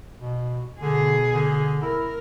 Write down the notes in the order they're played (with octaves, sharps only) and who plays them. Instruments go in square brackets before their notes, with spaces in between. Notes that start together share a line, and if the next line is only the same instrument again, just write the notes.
[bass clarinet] B2
[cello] B2 G#4 [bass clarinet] D3
[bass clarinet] D3
[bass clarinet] E4 [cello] A#4